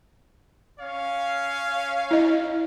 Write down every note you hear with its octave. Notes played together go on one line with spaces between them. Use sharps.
C#4 C#5 F5
E4 D#5